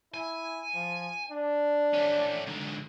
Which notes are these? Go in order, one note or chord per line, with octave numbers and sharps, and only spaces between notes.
E4 G#5
F3
D4
A3 C#4
G#2 D3